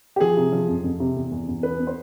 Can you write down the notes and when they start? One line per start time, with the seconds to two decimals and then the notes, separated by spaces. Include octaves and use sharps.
0.16 G4
0.20 F3 G#4
0.37 C3
0.52 F3
0.68 F2
0.84 F2
1.00 C3
1.16 E2
1.31 E2
1.48 E2
1.63 B3 B4
1.79 B3
1.87 C5